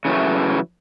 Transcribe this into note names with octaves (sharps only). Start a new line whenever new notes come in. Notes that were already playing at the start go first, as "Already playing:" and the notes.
C#3 E3 F#3 A3